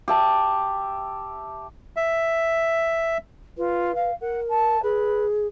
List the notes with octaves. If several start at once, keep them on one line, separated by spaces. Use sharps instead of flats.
G4 E5 A5
E5
F4 B4
F5
A#4 F#5
A5
G#4 B4